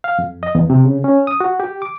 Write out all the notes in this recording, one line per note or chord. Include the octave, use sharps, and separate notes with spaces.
F5
F2
D#5
E2
C3
C#3
C#4
D#6
F#4
G4
D6